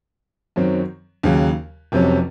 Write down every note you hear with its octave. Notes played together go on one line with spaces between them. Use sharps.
F#2 D#3 F#3 C4
D#2 C#3 F#3
F1 F2 C3 F#3 C#4